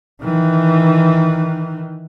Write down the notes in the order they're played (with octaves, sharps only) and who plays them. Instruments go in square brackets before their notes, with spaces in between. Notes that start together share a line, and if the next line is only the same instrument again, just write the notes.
[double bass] D#3 E3